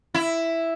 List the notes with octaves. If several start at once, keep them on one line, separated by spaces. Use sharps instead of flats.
E4